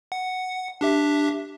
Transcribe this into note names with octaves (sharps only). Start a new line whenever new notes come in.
F#5
D4 G4 E5